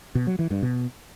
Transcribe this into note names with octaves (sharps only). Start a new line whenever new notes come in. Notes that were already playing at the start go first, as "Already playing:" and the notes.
B2
F#3
E3
G2
B2